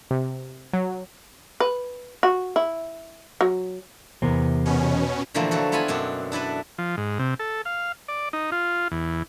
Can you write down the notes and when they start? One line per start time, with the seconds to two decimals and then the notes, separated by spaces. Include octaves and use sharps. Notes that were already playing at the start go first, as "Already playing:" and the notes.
0.11 C3
0.73 F#3
1.60 B4
2.23 F#4
2.56 E4
3.41 F#3
4.22 E2 C3 E3 A#4 C5
4.66 B2 C#4
5.34 A#2 D3 E3 F3 A3 A#3
5.51 F3 F#3 F#4 A4
5.72 B3 E4 F4 F#5 G#5 B5
5.88 F#2 B2 C4 D4
6.32 D4 E4 A4 B4
6.78 F3
6.97 G#2
7.19 C3
7.39 A4
7.65 F5
8.08 D5
8.33 D#4
8.52 F4
8.92 E2